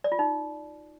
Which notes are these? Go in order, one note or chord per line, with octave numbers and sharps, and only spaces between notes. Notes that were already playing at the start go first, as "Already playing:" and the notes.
D5
F4
D#4